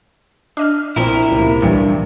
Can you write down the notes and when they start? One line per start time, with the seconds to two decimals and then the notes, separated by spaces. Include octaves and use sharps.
0.57 D4 D#5 F6
0.96 A#1 A#2 C4 E4 A#4
1.31 C#2 C3 A#3
1.62 A#1 G2 E3 G3